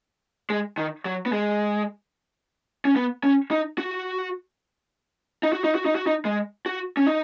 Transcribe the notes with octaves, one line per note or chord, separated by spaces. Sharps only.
G#3
D#3
F#3
B3
G#3
C#4
B3
C#4
D#4
F#4
D#4
F#4
D#4
F#4
D#4
F#4
D#4
G#3
F#4
C#4
D#4